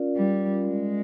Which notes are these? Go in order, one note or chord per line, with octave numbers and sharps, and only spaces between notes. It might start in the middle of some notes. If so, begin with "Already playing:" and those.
Already playing: C#4 F4 A#4 D5 F5
G3
G#3